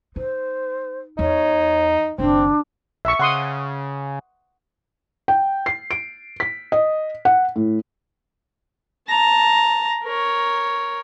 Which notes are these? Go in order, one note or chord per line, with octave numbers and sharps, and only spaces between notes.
D#4 C5
E2 D#4 C#5
F#1 D#3 C4 D4
A#1 E5 C#6
C#3 F#5 C6 D#6
G5
C7
D7
B6
D#5
F#5
A2
A5 A#5
A#4 C#5